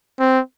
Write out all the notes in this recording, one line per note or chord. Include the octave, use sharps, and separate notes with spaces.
C4